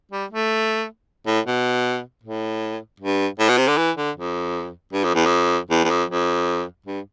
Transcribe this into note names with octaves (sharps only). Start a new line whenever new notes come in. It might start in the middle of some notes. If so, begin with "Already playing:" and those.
G3
A3
A2
B2
A2
G2
A2
B2
C3
D3
E3
D3
F2
G2
F2
E2
F2
E2
E2
F2
F2
G2